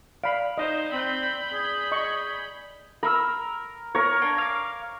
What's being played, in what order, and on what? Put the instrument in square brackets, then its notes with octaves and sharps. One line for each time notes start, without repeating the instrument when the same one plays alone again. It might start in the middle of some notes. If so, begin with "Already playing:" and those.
[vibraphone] D5 [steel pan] F5 B5
[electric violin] D#4 C5 [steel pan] D#5
[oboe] C4 [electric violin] B5 G6
[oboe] G#4
[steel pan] D#5 C#6
[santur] A#4 [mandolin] B5 C#6 E6
[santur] A#4 C#5
[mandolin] A#3 D4
F5 D6